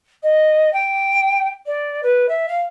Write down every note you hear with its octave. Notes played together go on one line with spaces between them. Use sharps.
D#5
G5
D5
B4
E5
F5